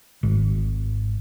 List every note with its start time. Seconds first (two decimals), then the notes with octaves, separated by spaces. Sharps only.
0.23 G#1